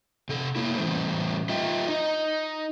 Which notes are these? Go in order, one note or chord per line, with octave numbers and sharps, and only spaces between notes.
C3 A4
A3 A#3 E4
A2 E3 G3 C#4 C5
F4 D#5 E5 G5
D#4 D#5